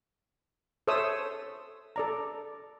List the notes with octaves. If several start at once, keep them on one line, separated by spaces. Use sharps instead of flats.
A4 C5 C#5 E5 D#6 E6
A4 D5 A#5